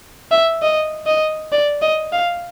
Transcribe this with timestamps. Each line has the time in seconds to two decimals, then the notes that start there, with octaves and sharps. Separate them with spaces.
0.31 E5
0.62 D#5
1.06 D#5
1.52 D5
1.82 D#5
2.13 F5